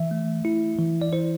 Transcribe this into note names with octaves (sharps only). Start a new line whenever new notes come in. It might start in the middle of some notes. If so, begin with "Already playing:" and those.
Already playing: E3 E5
A3
E4
E3
D5
E4 C5